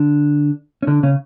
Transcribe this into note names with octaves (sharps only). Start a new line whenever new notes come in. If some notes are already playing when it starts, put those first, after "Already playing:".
Already playing: D3 D4
C#4
D3 D4
C#3 C#4